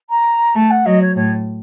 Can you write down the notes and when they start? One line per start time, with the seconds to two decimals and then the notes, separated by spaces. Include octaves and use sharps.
0.09 A#5
0.55 A3 A5
0.70 F#5
0.85 F#3 D#5
1.01 C#5
1.16 A2 C#5